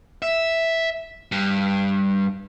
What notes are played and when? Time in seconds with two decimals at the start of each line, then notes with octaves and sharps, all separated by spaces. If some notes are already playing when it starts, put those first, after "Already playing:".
0.22 E5
1.32 G2